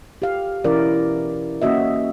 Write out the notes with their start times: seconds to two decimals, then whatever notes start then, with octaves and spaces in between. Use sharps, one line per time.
0.22 G4 F5
0.64 B2 E3 C#4 E4 A#4 D5
1.62 A#3 C#4 F#4 D#5 E5